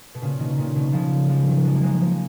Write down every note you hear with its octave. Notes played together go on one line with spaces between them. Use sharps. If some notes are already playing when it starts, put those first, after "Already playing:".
B2
A#2 C#3
B2 D#3
A#2 C#3
B2 D#3
C#3 F3
F3 G#3
D#3 F#3
F3 G#3
A#3
F3 G#3
F3 G#3